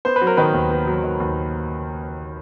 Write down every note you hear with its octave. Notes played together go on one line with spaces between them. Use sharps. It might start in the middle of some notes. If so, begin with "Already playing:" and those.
B3 C5
B4
F#3
A#4
D#3 B3 B4
D#2
B3
F#3
D#3
D#2